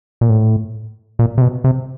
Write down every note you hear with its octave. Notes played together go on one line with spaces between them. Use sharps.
A#2
A2
A#2
C3
B2
C3